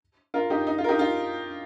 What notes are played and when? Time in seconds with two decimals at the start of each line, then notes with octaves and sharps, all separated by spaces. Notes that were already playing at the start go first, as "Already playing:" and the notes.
0.34 F4 A#4
0.50 D#4 G4
0.67 D#4
0.78 F4
0.84 A#4
0.88 D#4 G4
0.99 F4